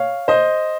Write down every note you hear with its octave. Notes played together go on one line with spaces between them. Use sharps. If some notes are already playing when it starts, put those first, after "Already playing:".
Already playing: C#5 F5
C5 D#5